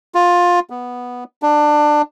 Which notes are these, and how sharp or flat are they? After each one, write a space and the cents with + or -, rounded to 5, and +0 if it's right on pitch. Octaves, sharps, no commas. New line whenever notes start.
F4 +15
B3 -5
D4 +20